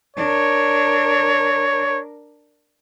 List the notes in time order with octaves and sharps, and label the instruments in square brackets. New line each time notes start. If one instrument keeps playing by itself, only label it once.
[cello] D4 A#4 [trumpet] C#5